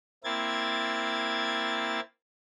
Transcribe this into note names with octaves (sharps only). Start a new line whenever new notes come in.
A#3 C4 E4 G#6 A6